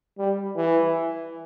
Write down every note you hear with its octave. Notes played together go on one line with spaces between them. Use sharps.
G3
E3